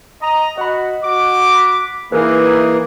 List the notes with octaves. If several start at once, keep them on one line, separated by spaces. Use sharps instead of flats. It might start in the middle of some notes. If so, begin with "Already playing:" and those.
D#5 A#5
F#4 D#5 F#5 B5
F#4 D6
B5 B6
E3 A#3 D#4 E4 G#4 A#4 B4